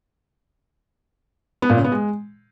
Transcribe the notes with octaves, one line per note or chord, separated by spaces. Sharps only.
B3
A#2
C#3
B3
G#3